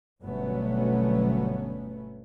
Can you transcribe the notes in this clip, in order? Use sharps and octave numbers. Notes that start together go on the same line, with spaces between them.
G1 B2 F#3 A3 B3 C#4